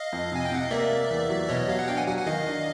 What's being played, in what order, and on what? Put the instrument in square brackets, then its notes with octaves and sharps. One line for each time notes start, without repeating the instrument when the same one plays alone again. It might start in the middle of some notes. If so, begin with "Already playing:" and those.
Already playing: [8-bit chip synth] D#5 F5
[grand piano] F2
[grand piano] C3 [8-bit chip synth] G#5
[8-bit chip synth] G5
[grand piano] C3 [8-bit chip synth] F#5
[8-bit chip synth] F5
[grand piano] A#3 [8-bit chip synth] D5 E5
[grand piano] A#3
E2
F#3
[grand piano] B2 [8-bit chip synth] C#5 D#5
[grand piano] F#3 [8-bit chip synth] F5
[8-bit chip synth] F#5
[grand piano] D4 [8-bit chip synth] F5 G5
[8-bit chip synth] F#5 G#5
[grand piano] F#3 [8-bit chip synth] F#5 G#5
[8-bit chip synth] F#5 G#5
[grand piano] D#3 [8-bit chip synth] D#5 F5
[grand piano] D4